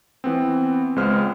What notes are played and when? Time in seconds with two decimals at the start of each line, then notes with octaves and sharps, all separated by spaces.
0.24 E3 B3 C4
0.96 C#2 G#3 B3 C5 F6